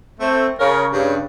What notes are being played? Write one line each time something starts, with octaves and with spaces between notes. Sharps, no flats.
A3 C4
C#3 A#4 C#5
G2 C#3